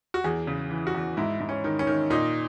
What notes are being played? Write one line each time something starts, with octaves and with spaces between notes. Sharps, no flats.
F#4
E2 G#4
C#3
E3
F#4
E2
G#2 E4
G#2
C#4
D#3
C#4
D#3
A#2 D#4